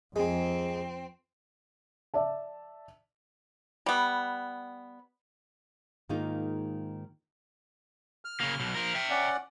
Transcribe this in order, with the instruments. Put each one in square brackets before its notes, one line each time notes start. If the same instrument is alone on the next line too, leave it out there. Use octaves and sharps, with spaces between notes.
[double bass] F2 [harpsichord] G#3 [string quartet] C4 [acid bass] G#4
[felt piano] D5 E5 A5
[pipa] G3 B3
[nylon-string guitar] G#2 D#3 G#3 A#3 D#4 F4
[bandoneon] F6
[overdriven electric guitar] C#3 A#3
B1 B2
F3 A#4
E5 G5
[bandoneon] C#4 D5 F#5